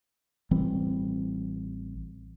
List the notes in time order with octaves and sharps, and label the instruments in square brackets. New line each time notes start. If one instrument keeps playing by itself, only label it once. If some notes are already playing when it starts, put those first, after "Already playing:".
[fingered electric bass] A1 E3 G3 C4